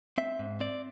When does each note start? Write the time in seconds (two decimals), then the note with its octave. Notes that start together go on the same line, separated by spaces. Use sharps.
0.18 C4 E5
0.39 G#2
0.60 C4 D5